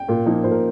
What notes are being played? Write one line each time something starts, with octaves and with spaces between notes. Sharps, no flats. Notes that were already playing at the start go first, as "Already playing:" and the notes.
Already playing: G5
A#2
F3 A#3 D#4
A#2 C5
A#4